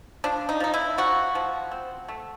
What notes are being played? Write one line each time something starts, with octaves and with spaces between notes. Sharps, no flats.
F3 D4
D#4
F3 D#4
E4
F3 F#4
F3
C4
A3